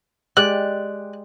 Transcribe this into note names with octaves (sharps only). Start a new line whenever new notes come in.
G#3 G4 D5 F#6